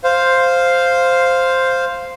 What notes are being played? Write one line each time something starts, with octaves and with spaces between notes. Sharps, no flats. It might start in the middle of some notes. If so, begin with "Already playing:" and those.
C5 F5